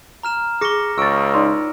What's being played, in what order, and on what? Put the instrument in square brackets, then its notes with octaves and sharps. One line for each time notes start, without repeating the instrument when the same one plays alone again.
[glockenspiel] A#5 F6 E7
[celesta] G#4 G7 [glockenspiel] D6 A#6 C#7
[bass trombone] C#2 [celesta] C#6 A6 [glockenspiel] E6 D7
[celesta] D#4 D5 C6